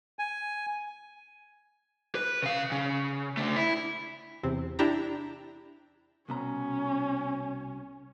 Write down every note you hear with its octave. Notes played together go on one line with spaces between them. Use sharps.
G#5
B4
C#3 F5
C#3
D3 A3
E4
E2 C3 C4
D4 E4 G4 A#5
C2 B2 C#4 A#5